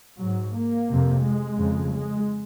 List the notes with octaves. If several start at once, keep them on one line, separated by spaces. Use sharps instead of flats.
G#2 F#3
A#3
F2 C3
G#3
F2 C#3
G#3